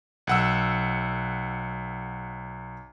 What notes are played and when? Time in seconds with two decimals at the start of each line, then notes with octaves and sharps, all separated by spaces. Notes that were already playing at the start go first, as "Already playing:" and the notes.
0.27 B1 F#5 E6